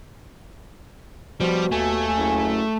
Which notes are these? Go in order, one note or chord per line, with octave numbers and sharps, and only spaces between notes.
B2 F3 G3
D#2 A3 G#5
F#1